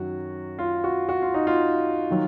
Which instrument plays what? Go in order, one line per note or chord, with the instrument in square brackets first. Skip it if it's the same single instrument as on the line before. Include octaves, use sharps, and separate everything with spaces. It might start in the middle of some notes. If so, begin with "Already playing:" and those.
Already playing: [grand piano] F#2 D#3 F#3 F#4
F4
F#4
F#4
F4
D#4
F4
D#3 F#3